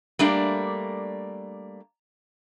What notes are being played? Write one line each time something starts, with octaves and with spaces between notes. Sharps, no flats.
G3 A3 A#3 D4 D5